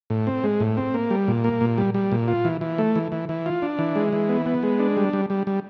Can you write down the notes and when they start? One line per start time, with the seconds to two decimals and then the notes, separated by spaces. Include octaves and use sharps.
0.10 A2
0.27 C4
0.44 G#3
0.60 A2
0.77 C4
0.94 A#3
1.11 G3
1.28 A#2
1.44 A#3
1.61 A#2
1.78 G3
1.94 G3
2.12 A#2
2.28 F4
2.45 E3
2.61 E3
2.78 A3
2.95 E3
3.12 E3
3.29 E3
3.46 F4
3.62 D4
3.79 E3
3.96 G#3
4.13 E3
4.29 B3
4.46 B3
4.63 G#3
4.79 D4
4.97 G3
5.13 G3
5.30 G3
5.47 G3